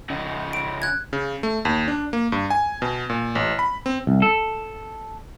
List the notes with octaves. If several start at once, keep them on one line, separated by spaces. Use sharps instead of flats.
C#3 D#4
D7
F#6 G#6
C#3
A3
D#2
D4
A#3
G2
G#5
B2
A#2
A1
B5
C4
C2
A4